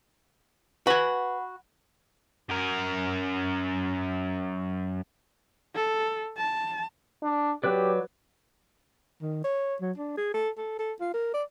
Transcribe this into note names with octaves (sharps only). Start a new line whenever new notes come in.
F#4 B4 F#5 G#5 B5
F#2 A#4
A4
A5
D4
F#3 G4 B4 D5
D#3
C#5
F#3
D4
G#4
A4
A4
A4
F4
A#4
D5